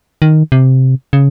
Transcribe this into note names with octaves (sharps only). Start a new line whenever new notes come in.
D#3
C3
C#3